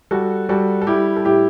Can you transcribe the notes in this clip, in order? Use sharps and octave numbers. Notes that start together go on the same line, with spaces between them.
G3 F#4 A4
G3 F#4 A4
A4
G3 E4 G4
A4
A2 E4 G4